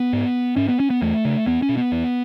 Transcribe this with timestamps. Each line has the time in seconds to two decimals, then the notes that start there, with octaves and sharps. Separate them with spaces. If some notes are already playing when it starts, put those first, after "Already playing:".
Already playing: B3
0.13 G#2
0.56 G#2 C#4
0.68 B3
0.80 C#4
0.90 B3
1.02 E2 A3
1.25 C#3
1.46 E2 B3
1.62 C#4
1.69 B2
1.77 B3
1.92 E2